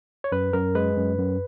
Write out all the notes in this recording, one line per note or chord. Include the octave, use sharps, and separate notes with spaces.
C#5
F#2 B4
F#2 A#4
G#3 B4
F#2
F#2